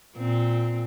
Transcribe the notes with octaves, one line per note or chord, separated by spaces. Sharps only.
A#2 C4